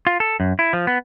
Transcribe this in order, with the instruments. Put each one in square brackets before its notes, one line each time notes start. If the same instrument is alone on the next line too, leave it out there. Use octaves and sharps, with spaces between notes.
[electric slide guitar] F4
A4
F#2
E4
F3
B3